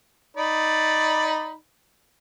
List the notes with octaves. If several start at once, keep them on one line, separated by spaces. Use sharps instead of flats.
D#4 D5 B5